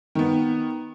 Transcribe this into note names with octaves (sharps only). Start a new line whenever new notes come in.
D#3 B3